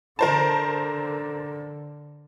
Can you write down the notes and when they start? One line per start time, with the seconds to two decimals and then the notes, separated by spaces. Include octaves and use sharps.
0.19 D3 A#4 C5 A5